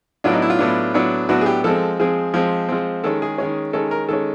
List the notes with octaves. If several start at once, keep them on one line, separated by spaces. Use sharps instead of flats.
A2 F#3 B3 D4 F4
D#4
E4
F4
A2 F#3 B3 D4
A2 F#3 B3 D4
A2 F#3 B3 D4 F#4
G#4
G4
F3 G#3 C4 A4
F3 G#3 C4 G#4
F3 G#3 C4
F3 G#3 C4
D#3 G#3 C#4 A4
G#4
D#3 G#3 C#4
D#3 G#3 C#4 A4
A#4
D#3 G#3 C#4 A4